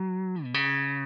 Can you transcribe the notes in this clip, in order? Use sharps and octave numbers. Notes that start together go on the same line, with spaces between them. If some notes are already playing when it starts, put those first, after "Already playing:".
Already playing: F#3
B2
C#3